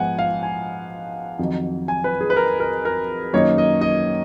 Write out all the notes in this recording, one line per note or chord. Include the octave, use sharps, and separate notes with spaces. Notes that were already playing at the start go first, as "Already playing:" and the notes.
Already playing: G#2 F3 B3 F#5 G#5
F5
G#5
F2 D#3 F#3
G#5
B4
G#4
B4
A#4
A#4
A#4
F#2 D#3 A#3 D#4 C#5
D#5
D#5